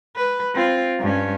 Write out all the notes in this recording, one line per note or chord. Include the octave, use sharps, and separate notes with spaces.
B4
C4 F4
G2 C#4